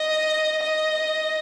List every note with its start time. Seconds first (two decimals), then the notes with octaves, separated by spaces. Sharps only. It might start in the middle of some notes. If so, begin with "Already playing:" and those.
Already playing: D#5
0.62 D#5